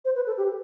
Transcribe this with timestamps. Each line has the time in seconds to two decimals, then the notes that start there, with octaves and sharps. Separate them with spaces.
0.05 C5
0.16 B4
0.27 A4
0.38 G4